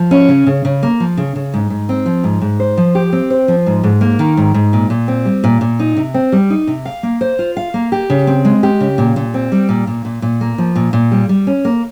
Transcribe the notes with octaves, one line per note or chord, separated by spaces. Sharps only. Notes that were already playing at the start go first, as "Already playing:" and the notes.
Already playing: F3
C#4
C#3
C#3
C#3
A#3
F3
C#3
C#3
G#2
G#2
C4
F3
G#2
G#2
C5
F3
G4
C4
C5
F3
G#2
G#2
A#3
D#3
G#2
G#2
A#2
A#2
C4
G3
A#2
A#2
D#4
C3
C4
G3
D#4
C3
F5
A#3
C5
F4
F5
A#3
G4
C#3
C4
G#3
G4
C#3
A#2
A#2
C4
G3
A#2
A#2
A#2
A#2
A#3
F3
A#2
A#2
G3
G3
C#4
A#3